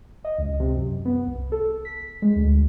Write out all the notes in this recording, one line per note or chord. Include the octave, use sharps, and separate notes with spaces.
D#5
C#2
C3
F#2
B3
C2
A4
B6
G#3
D2